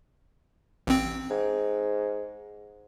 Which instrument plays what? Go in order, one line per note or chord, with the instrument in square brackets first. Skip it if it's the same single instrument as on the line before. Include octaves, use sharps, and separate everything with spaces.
[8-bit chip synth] A1 C4
[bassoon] G#2